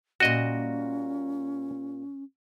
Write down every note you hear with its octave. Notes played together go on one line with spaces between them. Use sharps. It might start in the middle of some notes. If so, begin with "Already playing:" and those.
A#2 G3 C#4 F#4 D#5